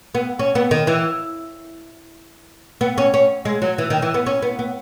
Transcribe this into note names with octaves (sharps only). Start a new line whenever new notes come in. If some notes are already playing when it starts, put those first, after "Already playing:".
B3
C#4
B3
D#3
E3
B3
C#4
C#4
G#3
F#3
E3
D#3
E3
B3
C#4
B3
B3